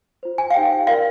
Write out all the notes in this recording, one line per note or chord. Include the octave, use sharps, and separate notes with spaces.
F4 C5
G#5
F5
D#4 G4 C5 G5
F4 A#4 D5 F5